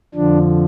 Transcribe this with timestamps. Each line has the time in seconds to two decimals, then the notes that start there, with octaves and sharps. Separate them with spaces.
0.14 F2 D3 F3 D4